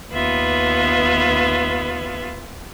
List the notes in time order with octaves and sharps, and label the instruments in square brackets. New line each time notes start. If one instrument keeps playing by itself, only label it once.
[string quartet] D#2 B3 F4 B4 E5